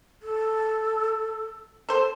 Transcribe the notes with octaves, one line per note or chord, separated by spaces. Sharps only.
A4
A4 C5